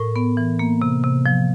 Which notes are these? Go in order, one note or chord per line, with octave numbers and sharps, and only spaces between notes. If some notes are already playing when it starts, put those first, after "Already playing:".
Already playing: A2 A#4
B3
E3
A#3
C3
C3
F3